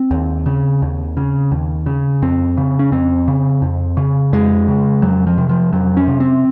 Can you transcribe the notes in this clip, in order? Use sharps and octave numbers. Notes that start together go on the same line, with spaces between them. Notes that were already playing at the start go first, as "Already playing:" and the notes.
Already playing: C4
D#2
C#3
D#2
C#3
D#2
C#3
F2 C4
C#3
C#4
F2 C4
C#3
F2
C#3
F2 G#3
C#3
F2 F#3
F3
C3
F3
F2 F#3
C#4
C3
C4